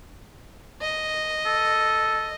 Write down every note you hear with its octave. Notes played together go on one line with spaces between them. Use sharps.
D#5
A4